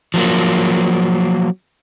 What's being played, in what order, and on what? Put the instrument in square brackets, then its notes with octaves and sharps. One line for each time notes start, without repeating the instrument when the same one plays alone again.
[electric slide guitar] F3 F#3 A#3